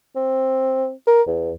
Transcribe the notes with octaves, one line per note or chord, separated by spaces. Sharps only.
C4
A#4
E2